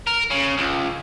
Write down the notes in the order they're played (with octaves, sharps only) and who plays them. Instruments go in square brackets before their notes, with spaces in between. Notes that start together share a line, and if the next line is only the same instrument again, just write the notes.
[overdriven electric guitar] A#4
C#3
C#2